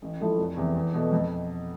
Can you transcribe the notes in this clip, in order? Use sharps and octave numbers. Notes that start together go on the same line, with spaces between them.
A1
A2 F3 A3 E4
F1
E2 C3
E2
B2 A3
F2